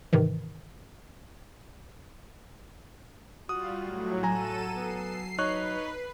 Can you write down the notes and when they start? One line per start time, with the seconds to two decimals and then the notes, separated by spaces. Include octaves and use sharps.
0.13 G#2 C3 D#3 E3
3.49 G3 F4 F#4 D#6
3.81 A2 F#3
4.23 F#3 A4 G#5 A#5 D#7 E7
4.76 B3 C7
5.39 D#4 B4 C#5 C#6 F#6